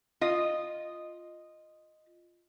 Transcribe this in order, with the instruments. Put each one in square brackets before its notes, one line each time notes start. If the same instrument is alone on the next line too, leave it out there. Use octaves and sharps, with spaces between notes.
[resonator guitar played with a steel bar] F4 D#5